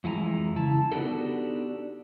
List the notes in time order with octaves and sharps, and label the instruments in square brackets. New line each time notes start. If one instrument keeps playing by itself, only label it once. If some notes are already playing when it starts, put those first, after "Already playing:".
[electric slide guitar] F2 E3 G#3 G#5 A#5
C#3 E4 A5
B3 D4 D#4 F#4 G4 A4